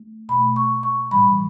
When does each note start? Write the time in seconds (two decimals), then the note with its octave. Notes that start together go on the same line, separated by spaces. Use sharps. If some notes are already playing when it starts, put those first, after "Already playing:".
Already playing: A3
0.29 B2 A3 B5
0.56 C#6
0.83 C#6
1.11 A2 E3 G3 B5